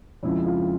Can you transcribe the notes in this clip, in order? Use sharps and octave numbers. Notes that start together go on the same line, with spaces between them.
F2 C#3 F3 G#3 E4
F4